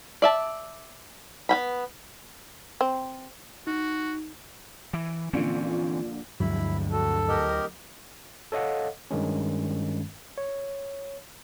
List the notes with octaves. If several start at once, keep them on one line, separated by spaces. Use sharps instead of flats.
D5 E5 A5
B3 G5 B5
C4
D#4 F#4
E3
A#2 D3 E3 F3 C4 C#4
D2 G2 D3 F3 F#3 G#3 E4 B5
F#4 A4
G4 A#4 D#5
A4 C#5 D#5 F5 F#5
G2 D#3 G#3 C#4
C#5